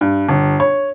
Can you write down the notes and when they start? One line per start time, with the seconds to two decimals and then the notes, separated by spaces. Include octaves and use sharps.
0.01 G2
0.29 G1
0.60 C#5